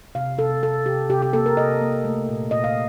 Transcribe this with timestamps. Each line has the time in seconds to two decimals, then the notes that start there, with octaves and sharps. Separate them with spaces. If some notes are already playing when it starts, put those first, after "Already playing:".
0.15 C3 F5
0.38 C3 A4
0.63 C3 A4
0.86 C3 G4
1.09 C3 G4
1.22 G4
1.33 A#3 A4
1.46 A#4
1.57 C3 D#5
1.81 A#3
2.05 A3
2.29 A#2
2.51 A#2 D#5
2.64 F5